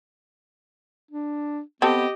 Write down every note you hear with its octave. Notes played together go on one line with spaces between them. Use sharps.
D4
B3 C4 G4 A4 D#5